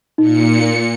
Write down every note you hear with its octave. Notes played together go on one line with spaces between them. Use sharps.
A#2 D#4 C#7